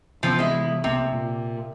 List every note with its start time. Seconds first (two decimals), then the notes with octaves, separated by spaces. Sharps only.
0.23 C3 E3 F3 B3 C4
0.39 G#3 E4
0.84 B1 C3 A#3 B3
1.12 A#2 A#3